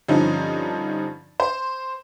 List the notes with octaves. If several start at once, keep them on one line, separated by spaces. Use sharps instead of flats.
G2 D3 F3 C#4 D#4
C5